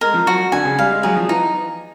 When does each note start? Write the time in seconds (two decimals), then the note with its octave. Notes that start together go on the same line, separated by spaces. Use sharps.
0.01 G#3 A#4
0.14 F3
0.27 F#3 F#4
0.52 D3 G#5
0.65 C#3
0.78 G3 F5
0.91 G#3
1.03 F#3 G#4
1.16 F3
1.29 E3 D#4